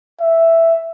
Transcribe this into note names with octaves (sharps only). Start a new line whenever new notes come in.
E5